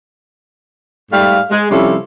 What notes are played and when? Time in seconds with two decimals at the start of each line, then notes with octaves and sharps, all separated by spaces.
1.11 G#2 G3 A3 F5
1.50 G#3
1.71 C3 F3 G3 C#4 E4 A4